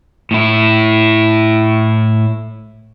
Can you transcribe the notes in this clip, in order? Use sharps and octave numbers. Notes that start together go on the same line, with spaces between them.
A2 E4